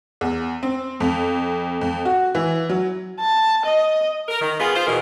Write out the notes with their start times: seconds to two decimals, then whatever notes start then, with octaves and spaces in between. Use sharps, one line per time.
0.21 E2
0.63 C4
1.00 F2
1.81 F2
2.05 F#4
2.35 E3
2.69 F#3
3.20 A5
3.66 D#5
4.29 A#4
4.40 D#3
4.58 B3 F4 G#4
4.74 F4 C5
4.86 E2 B2 D#3 G#4 A#4